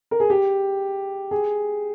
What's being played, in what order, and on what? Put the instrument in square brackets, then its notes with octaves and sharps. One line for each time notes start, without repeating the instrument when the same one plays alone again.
[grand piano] A#4
G#4
G4
G#4